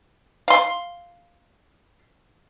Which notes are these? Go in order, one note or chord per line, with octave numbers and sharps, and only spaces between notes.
F5 C6